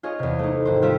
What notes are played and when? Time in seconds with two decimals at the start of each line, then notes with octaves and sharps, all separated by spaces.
0.03 F4 G#4 C#5 D#5
0.19 E2 C3
0.39 A3 D#4
0.65 G#1 C5
0.82 G3 F4 G4 C5 E5